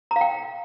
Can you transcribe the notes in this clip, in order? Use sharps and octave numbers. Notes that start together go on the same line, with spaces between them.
A#5
F5
G5